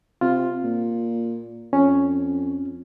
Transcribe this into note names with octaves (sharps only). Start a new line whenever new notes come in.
C3 F4
A#2
F2 C#4